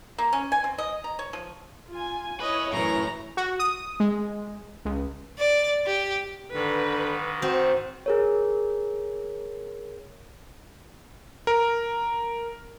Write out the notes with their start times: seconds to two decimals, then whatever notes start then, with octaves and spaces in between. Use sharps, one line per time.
0.18 A#3
0.33 C#4
0.52 G#5
0.64 C4
0.78 D#5
1.04 A#5
1.19 C#5
1.33 F3
1.88 F4 G#5
2.40 E4 B4 C#5 D#5
2.73 F#2 A2 E3 A#5
3.37 F#4
3.59 D#6
4.00 G#3
4.85 C#2
5.39 D5
5.86 G4
6.54 G#2 D3 D#3 B4
7.42 C4 F#4
8.06 G#4 A#4 C#5
11.47 A#4